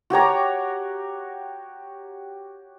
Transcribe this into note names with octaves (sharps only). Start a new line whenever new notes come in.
F#4 G4 C#5 A#5